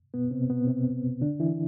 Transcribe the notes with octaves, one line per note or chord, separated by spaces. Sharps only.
B2 B3
C3 C4
B2 B3
C3 C4
D3 D4
E3 E4